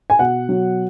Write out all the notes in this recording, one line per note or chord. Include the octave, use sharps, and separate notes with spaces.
G#5
B2 F#5
F#3